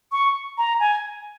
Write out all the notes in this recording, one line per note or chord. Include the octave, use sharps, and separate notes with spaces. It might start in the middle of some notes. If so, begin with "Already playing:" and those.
C#6
A#5
G#5